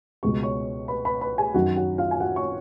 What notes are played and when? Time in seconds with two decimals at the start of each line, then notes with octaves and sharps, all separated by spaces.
0.23 C#2 B2 G#3 B3 C#6
0.43 C#5 C#6
0.88 B4 B5
1.05 B4 B5
1.21 B4 B5
1.38 G#4 G#5
1.54 F#2 D#3 F#3 F#4 F#5
1.76 F#4 F#5
1.98 F4 F5
2.11 G#5
2.20 F#4 F#5
2.36 C#5 C#6